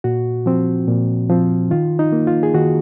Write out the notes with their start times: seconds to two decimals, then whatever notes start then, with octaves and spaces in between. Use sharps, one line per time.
0.04 A#2 F#4
0.46 F3 C4
0.88 A#2
1.29 F3 C4
1.71 D#3 F4
1.99 D#4
2.13 A#3
2.27 F4
2.43 G#4
2.54 D#3 F#4